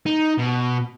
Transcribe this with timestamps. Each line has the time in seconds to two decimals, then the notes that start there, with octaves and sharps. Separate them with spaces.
0.06 D#4
0.39 B2